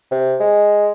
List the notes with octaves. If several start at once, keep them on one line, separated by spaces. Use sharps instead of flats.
C3
G#3